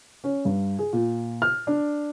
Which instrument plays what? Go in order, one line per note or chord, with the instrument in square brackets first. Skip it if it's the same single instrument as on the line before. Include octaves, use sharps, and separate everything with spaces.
[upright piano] C#4
G2
G#4
A#2
F6
D4